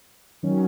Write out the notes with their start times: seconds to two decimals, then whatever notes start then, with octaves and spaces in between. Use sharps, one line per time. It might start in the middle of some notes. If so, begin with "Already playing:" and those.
0.43 D#3 F#3 C#4